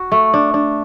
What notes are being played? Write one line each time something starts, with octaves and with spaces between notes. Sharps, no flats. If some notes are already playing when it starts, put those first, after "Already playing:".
Already playing: F#4
A3
D4
D4